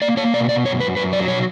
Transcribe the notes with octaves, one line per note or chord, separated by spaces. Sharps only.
A#3 D5
A#3 C#5
B2 D5
B2 D5
F#2 C#5
F#2 B4
F#2 B4
F#3 D5
B2 C#5